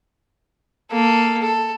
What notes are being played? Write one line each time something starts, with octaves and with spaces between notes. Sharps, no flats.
A#3 A4
A4